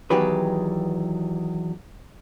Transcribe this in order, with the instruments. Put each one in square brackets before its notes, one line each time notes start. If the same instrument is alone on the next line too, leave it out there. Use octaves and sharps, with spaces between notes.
[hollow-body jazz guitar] E2 D#3 F#3 G4 B4